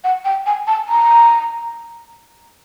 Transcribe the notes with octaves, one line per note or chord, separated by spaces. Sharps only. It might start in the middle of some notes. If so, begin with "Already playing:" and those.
F#5
G5
G#5
A5
A#5